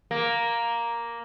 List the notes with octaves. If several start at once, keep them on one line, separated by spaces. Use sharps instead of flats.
A#3